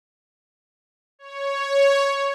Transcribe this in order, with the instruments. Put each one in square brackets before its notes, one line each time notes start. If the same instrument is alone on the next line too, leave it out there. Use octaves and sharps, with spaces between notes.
[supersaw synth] C#5